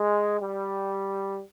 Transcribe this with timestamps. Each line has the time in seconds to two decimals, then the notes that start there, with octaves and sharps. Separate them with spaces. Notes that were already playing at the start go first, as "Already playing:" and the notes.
Already playing: G#3
0.41 G3